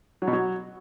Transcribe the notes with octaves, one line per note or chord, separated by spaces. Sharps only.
F#3
B2
F#3